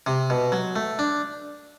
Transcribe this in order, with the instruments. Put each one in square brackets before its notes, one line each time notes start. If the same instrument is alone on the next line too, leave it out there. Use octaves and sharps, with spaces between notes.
[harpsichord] C3
B2
F#3
A3
D4